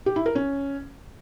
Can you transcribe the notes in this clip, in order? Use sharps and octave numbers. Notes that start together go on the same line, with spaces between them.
G4
E4
A#4
C#4